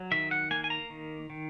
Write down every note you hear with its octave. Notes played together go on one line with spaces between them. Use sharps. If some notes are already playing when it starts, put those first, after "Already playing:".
Already playing: F#3
D#3 E5
F#5
A#3 G#5
G#5
A#5
D#3
D#3